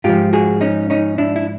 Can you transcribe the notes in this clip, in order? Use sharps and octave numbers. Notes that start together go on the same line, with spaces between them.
G#2 F3 F4 G4
F#4 G#4
C#4 D#4
C#4 D#4
D4 E4
E4